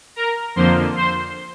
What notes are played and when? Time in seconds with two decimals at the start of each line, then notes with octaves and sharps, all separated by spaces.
0.16 A#4 A#5
0.56 F2 D3 F3 A#3 C5 C6
0.96 C5 C6